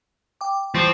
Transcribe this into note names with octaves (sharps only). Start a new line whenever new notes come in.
G5 D6
E3 F3 G3 C4 C#6